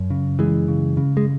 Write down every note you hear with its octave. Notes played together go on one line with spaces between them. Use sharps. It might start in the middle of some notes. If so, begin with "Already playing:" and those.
Already playing: F#2
C#3
F#2 E3 G#3
C#3
C#3
G#3